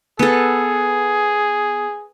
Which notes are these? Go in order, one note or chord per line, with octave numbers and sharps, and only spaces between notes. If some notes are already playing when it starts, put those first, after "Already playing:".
B3 G#4 A4